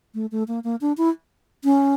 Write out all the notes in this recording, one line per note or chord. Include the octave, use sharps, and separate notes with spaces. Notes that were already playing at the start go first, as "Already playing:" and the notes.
A3
A3
A#3
A#3
D4
E4
C#4